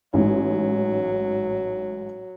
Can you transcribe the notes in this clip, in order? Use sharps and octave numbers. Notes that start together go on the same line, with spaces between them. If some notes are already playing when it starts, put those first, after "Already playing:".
A1 G#2 F#3